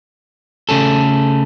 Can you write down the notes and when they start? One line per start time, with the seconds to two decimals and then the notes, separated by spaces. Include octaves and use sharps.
0.69 C#3 A3 C#4 A4